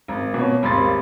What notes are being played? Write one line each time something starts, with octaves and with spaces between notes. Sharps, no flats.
G#1
B2 C#5
D#1 G#1 B5 C6 A6